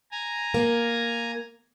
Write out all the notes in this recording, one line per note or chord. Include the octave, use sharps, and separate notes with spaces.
G#5 A#5
A#3